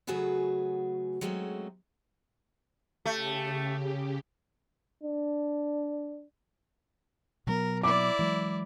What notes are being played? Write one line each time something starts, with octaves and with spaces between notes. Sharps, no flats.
C#3 F#3 A3 F#4 G#4 B4
F#3 G#3 A3 C4 C#4
C#3 A3 G4
D4
B2 F#3 B3 A#4
E4 D5 D6
E3 F#3 G#3